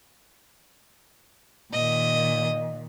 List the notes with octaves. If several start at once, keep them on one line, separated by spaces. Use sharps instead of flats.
A#2 D#3 D#5